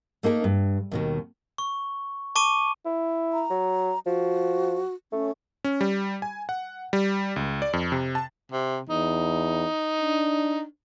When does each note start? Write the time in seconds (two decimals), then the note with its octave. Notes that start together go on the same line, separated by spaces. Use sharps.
0.23 A3 A#3 D#4 G#4 A#4
0.44 G2
0.92 D#2 B2 D#3
1.58 C#6
2.35 A5 C#6 D6 D#7
2.85 E4
3.33 A#5
3.50 F#3
4.06 F3 F#4
5.12 A3 C#4
5.64 C#4
5.81 G3
6.22 G#5
6.49 F#5
6.93 G3
7.36 C#2
7.62 D5
7.73 F2
7.92 C3
8.15 A5
8.52 C3
8.89 E2 D#4
10.01 D4